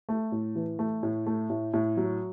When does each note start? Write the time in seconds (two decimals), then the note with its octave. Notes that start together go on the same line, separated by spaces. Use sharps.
0.09 A3
0.32 A2
0.55 E3
0.79 A3
1.03 A2
1.26 A3
1.50 A2
1.74 A2
1.97 F#3